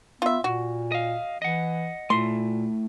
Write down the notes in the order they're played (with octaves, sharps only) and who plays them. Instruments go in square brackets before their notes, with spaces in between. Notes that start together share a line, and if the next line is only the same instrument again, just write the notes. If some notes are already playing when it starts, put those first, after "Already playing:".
[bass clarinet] B3 [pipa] F4 E5
[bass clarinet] A#2 [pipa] F#4
[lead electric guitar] D#5 F5
[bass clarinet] E3 [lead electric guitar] D#5 F#5
[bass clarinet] A#2 [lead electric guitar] A3 E4 [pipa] C6